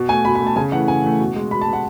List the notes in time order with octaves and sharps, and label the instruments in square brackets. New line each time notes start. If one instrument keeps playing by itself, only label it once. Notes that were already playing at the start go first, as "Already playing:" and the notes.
Already playing: [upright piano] B2
A3 G#5
B2 B5
B5
A3
A5
C#3 G#5
E3 A3 F#5
C#3 G#5
E3 A3
B2
G#3
B2 B5
A5
G#3
F#5